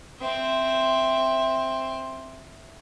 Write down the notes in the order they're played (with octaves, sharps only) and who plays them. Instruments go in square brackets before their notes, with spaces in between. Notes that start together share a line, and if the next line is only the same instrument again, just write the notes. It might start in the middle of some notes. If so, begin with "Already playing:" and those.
[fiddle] C4 E5